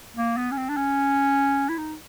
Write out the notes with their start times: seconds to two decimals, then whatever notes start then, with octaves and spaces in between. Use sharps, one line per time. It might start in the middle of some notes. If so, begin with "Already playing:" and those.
0.17 A#3
0.37 B3
0.52 C#4
0.57 C4
0.69 D4
0.77 C#4
1.69 E4
1.78 D#4